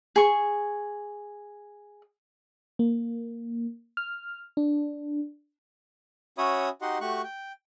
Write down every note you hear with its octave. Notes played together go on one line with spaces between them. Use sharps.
G#4 C#6
A#3
F6
D4
C#4 F#4 C#5 E5 B5 D#6
D#4 F#4 G4 D#5 F#5 C6
A3 F#4 G4 C#6 F#6
G5